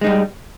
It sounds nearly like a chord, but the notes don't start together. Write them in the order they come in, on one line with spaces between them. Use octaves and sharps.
G#3 D#4 G3